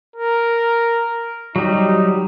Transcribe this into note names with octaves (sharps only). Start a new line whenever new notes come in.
A#4
F#3 G3 D#4